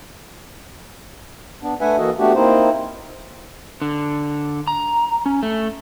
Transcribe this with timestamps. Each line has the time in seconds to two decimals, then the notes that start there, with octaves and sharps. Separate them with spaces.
1.63 B3 D4
1.81 A3 D4 B4 E5 F#5 G#5
1.98 E3 A#3 F#4 A4 D#5
2.18 A3 B3 D4 F#4 G4
2.35 A#3 C4 D#4 E4 C5
3.82 D3
4.67 A#5
5.26 C#4
5.43 A3